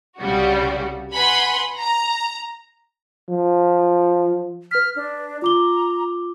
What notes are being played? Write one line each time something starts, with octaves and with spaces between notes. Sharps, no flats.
C2 C#3 G3 F#4
B4 F#5 G#5 B5 C6
A#5
F3
B4 F6 B6
D4
F4 A#5 D6 G7